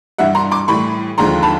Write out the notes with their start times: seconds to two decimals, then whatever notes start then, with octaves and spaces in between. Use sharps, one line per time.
0.18 G2 E3 G3 E5 F#5
0.35 A#5 C6
0.51 C6 D6
0.68 A2 E3 G3 B5 C#6
1.18 D#2 D3 F3 G#3 A#5 C6
1.43 A5 B5